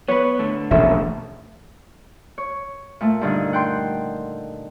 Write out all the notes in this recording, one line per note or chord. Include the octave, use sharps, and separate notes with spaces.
B3 B4 C#5
A2 D3 A3
E1 A#1 C#4 A4 E5
C#5
A#2 A3
G2 D3 D#3
F#5 G5 C6